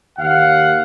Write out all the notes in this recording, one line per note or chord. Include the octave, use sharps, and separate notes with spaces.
D#2 F5 F#5